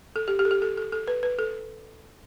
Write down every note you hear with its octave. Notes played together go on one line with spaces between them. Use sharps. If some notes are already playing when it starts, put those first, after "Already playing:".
A4
G4
G4
A4
G4
A4
A4
A4
B4
B4
A4